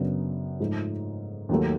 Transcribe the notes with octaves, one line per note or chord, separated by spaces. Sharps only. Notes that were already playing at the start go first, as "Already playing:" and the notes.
Already playing: F#2 C#3 F#3 B3 D4
G#2 F3 A3
D#2 D#3 F#3 A3